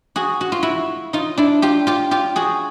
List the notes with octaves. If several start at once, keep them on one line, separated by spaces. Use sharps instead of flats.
F#4 G#4
F#4
F4
E4 F#4
D#4 F4
D4 E4
F4 G4
F4 G4
F4 G4
F#4 G#4